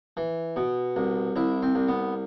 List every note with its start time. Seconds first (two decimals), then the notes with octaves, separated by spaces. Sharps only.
0.17 E3
0.56 B2
0.96 C2
1.36 C2 E4
1.63 C4
1.75 C2
1.88 B3